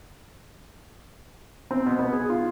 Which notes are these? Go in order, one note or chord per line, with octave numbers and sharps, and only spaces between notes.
C4
B2
B3
G#4
F4